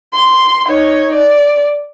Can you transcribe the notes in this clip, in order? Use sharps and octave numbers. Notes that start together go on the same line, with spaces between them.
C6
D#4 C#5
D5